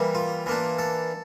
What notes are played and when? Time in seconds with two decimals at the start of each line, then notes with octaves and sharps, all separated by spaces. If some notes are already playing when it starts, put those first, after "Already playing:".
Already playing: E3 G3 A#3
0.15 F4
0.46 E3 A#3 D4
0.78 A4